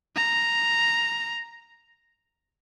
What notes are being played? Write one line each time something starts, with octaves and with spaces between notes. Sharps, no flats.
A#5